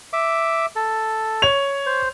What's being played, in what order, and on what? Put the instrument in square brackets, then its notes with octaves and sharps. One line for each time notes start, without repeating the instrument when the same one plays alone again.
[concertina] E5 D6
A4
[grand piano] C#5 F7
[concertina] C5